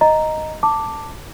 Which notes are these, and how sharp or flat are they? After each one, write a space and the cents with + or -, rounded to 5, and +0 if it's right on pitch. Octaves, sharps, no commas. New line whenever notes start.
D#5 +0 A#5 +0
A5 +15 D6 +0